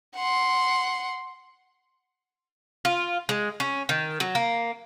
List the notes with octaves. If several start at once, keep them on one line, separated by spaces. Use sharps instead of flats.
F#5 C6
F4
G#3
C#4
D#3
F#3
A#3